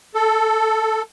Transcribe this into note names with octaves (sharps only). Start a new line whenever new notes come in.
A4